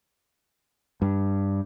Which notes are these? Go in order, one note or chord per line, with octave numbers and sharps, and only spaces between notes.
G2